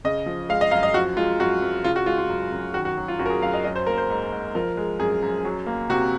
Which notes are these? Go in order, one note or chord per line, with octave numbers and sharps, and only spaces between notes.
C#3 D#5
F3
G#3 F5
D#5
F#2 F5
D#5
F3 F#4
G#3 F4
F#2 F#4
F#2
C#3 F4
F#4
G#3 F4
F4
F#2
F#2
D#3 F#4
F#4
F#3
F4
F#2 F#4
A#4
G#4
F#2 F5
D#5
F#3 D#5
C5
A#3 A#4
C5
G#2
G#2
F3 A#4
G#3
F#2 G#4
F#2
F#3
A#3
C3 F#4